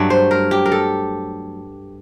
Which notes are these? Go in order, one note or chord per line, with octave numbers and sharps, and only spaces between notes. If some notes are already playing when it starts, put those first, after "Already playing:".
Already playing: G2 F#3 A3 D5
C5
A#4
G4
A#4
A4